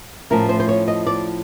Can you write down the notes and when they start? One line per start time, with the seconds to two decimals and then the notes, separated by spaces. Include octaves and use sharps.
0.30 A2 F3 A3 C#4 A#4
0.49 C5
0.60 C5
0.69 C#5
0.88 D#5
1.07 D5